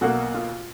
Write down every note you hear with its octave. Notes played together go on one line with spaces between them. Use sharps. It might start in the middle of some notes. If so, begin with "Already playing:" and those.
B1 B2 A#3 F#4
F4